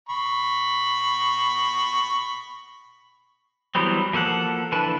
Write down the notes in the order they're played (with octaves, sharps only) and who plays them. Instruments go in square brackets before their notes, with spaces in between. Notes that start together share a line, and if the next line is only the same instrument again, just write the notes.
[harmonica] B5 C#6
[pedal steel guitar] E3 F#3 G3 B3 C4
F3 A#3 A4 F#5
D3 E3 B4 A5